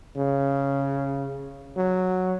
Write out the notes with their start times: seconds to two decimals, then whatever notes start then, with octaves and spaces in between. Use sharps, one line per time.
0.16 C#3
1.77 F#3